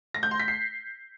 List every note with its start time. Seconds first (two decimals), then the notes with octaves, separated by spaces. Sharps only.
0.15 A#6
0.23 G6
0.31 C6
0.40 B6
0.48 C7